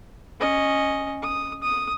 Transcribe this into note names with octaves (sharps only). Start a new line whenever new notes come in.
C#4 D#5
D#6
D#6